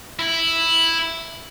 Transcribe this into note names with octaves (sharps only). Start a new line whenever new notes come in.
E4